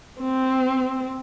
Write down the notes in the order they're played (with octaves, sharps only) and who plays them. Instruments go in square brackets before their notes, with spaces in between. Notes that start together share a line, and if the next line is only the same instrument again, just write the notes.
[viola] C4